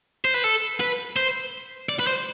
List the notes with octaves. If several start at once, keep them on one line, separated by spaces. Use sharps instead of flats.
C5
B4
A4
B4
C5
D5
B4
C5